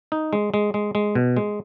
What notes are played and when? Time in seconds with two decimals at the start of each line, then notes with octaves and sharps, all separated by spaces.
0.12 D#4
0.33 G#3
0.54 G#3
0.74 G#3
0.95 G#3
1.15 B2
1.37 G#3